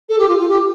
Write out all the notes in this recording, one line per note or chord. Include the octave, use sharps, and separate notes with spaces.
A4
G4
F4
F4
G4